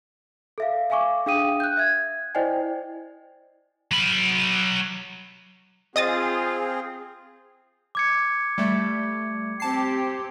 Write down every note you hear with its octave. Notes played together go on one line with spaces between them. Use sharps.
A4 E5 F5
E5 F5 G#5 C#6 D6
D4 G#4 F5 G5 D#6 D#7
F#6 G6
E5 G#6
E4 C5 D5 D#5 G5 G#5
F#3 B5
C4 F4 G#4 D#5 D#6 A6
D6 G#6 C#7
G3 A3
C4 G4 A5 C7